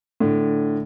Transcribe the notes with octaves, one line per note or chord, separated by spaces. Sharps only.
A2 D3